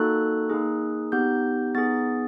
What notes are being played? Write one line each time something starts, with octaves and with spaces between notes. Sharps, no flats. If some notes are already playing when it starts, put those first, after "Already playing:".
Already playing: A#3 D#4 F#4 A4 F#6
A#3 D#4 G#4
B3 D#4 G4 G6
B3 D#4 G#4 A6